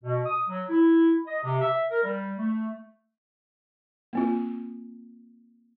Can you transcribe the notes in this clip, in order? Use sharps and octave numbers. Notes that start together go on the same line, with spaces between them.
B2
D#6
F#3
E4
D#5
C3
E5
A#4
G3
A3
A#3 C4 F4